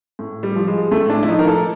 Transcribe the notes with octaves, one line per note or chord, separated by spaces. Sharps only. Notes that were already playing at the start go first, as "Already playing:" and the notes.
A2
G3
F3
G#3
A2 A3
D4
E4
F3 D#4
A#4
A4